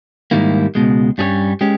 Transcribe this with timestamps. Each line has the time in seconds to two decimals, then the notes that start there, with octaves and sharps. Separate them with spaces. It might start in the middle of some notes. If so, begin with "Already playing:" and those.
0.31 G#2 D#3 G3 A#3 E4
0.75 C#2 B2 G#3
1.18 G2 G3 C#4 G#4 C#5
1.61 G#3 C#4 G4